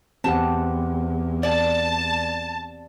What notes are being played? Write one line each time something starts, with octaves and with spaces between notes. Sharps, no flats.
E2 C4 G4 F#5 A5
D5 A5